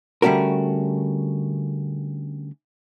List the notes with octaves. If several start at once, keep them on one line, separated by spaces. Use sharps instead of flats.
D3 G3 A3 C#4 F#4 A#4